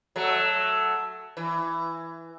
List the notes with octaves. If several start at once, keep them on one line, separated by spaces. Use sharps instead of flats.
F#3 A3
E3